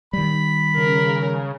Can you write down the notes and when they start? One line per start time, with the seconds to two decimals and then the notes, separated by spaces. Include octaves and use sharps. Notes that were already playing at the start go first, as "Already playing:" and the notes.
0.13 D#3 G3 B5
0.77 C#3 A#4